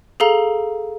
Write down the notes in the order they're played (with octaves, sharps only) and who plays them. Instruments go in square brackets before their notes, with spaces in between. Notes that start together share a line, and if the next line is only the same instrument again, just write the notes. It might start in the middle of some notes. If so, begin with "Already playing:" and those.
[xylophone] G#4 A4 F5 A#5